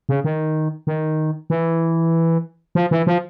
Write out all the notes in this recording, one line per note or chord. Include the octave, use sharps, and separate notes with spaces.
C#3
D#3
D#3
E3
F3
E3
F3